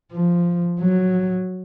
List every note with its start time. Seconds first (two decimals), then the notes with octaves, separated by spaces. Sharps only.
0.12 F3
0.80 F#3